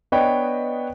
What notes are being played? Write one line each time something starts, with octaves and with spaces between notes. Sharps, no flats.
B3 D4 B4 C#5 D#5 G5